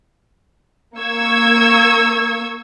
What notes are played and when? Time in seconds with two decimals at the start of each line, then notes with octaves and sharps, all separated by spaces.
0.97 A#3 C#6 E6 G#6